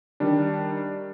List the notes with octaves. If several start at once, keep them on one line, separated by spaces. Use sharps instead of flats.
D#3 G3 D4